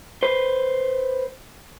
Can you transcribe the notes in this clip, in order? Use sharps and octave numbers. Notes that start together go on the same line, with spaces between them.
B4 C5